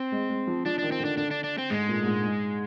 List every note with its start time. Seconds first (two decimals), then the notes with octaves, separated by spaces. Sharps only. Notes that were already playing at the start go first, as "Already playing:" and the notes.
Already playing: C4
0.12 G#3
0.30 G#3
0.47 F3
0.65 F3 D4
0.78 D#3 D4
0.92 C4
1.00 D3
1.05 D4
1.17 D3 D4
1.31 D4
1.44 D4
1.58 C4
1.70 G#2 G#3
1.88 A#2
2.03 A#2
2.06 G#2
2.23 G#2